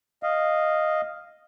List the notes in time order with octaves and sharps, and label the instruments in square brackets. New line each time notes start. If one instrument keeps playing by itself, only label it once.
[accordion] D#5 F5